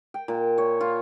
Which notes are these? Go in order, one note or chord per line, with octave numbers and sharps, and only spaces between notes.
G5
A#2
C#5
F4